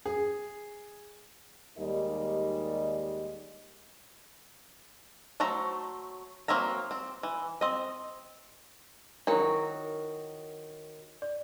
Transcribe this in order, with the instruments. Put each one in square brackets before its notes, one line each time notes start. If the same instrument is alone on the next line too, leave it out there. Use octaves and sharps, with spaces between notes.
[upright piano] G#4
[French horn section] D#2 G3 G#3 D#4 A#4 D#5
[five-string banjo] F#3 A3 C5 A#5
F#3 A#3 C4 E5 A#5
C4
E3
C4 D#5
[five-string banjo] D#3 F#3 F#4 [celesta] E4 A#4
[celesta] D5